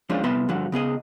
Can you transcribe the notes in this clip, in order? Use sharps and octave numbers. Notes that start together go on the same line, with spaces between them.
F3 G#3 C#4 D4 F4 C5
C2 B3 B4 E5 C6
G2 D3 F3 F#4 F#5
C#3 B3 G#4 D#5